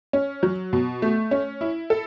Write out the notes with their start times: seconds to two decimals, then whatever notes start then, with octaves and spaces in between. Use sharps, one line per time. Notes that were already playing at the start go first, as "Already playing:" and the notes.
0.13 C#4
0.43 F#3
0.73 B2
1.02 A3
1.31 C#4
1.61 E4
1.90 A4